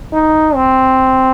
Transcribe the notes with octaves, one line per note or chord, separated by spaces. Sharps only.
D#4
C4